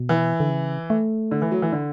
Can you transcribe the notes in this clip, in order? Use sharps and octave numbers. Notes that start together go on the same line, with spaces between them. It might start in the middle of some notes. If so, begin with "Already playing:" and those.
Already playing: B2
E3
D3
C#3
A3
D3
E3
F#3
E3
D3